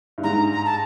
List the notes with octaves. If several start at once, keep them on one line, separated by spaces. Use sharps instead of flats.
G2
G#2 A#5
A#5
A5